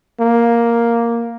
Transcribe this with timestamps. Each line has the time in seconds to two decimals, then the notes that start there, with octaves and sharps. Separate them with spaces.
0.20 A#3